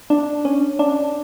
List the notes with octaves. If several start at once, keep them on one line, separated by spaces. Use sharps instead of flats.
D4
C#4
D4